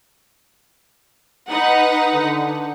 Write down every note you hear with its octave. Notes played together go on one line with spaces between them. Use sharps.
D#4 B4 F#5
D3